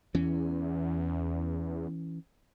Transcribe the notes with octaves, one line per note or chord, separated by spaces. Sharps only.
E2 E3 C#4